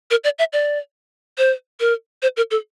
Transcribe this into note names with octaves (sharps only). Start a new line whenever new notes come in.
A#4
D5
E5
D5
C5
A#4
C5
A#4
A4